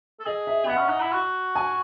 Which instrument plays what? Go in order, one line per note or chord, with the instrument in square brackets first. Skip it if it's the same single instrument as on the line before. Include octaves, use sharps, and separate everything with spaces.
[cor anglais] A4
[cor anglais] G#4 [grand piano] D#5
[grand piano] E5
[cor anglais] B3 [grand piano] F#5
[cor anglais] C#4
D#4
E4
F#4
[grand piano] G#5